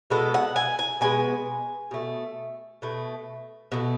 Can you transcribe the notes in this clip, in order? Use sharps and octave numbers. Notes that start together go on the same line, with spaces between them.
B2 G#3 B3 A4
F#5
G#5
G#5
B2 G#3 B3 G#5
B2 A3
B2 A3
B2 A3